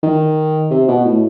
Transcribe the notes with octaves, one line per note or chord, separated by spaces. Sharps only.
D#3
C3
B2
A2